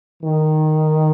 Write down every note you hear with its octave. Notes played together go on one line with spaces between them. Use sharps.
D#3